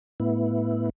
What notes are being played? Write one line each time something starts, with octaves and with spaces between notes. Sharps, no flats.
A2 B3 E4